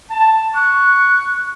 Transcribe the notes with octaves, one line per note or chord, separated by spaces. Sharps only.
A5
C#6 F#6